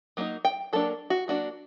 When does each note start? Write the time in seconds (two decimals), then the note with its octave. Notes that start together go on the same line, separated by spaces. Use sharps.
0.17 F#3 A#3 D#4
0.45 G5
0.73 F#3 A#3 D4 A4
1.10 F#4
1.28 F#3 A#3 D4 F#4